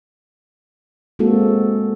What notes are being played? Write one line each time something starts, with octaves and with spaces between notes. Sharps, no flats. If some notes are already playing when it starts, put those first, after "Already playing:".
G#3 A#3 C4 F#4 A4